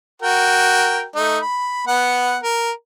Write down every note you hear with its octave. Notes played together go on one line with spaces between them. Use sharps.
F#4 A#4 G5
A3 D#4
B5
B3 F#5
A#4